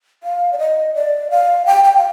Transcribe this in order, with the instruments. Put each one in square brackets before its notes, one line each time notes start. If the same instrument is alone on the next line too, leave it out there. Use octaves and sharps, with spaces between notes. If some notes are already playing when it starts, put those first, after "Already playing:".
[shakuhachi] F5
D5
D#5
D5
F5
G5
G5
F5